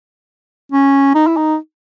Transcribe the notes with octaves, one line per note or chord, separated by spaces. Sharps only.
C#4
D#4
E4
D#4